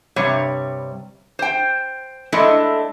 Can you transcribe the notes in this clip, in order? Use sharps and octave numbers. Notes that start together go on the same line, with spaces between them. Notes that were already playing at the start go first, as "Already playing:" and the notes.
G2 C3 G3 C#5
C5 G5
G#3 A3 D4 E4 A4 D#5